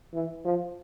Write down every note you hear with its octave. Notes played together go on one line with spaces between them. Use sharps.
E3
F3